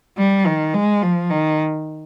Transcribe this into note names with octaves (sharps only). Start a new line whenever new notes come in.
G3
D#3
G#3
F3
D#3